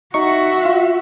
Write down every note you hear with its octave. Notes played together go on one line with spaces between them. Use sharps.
D#4 F#4 E5 C#6
F4